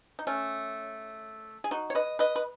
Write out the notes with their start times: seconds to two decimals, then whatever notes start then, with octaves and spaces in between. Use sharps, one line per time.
0.19 D#4
0.27 A3 C#4
1.64 G#4
1.71 D#4 F#4
1.90 C#5
1.95 B4 D#5
2.19 B4 D#5
2.36 B4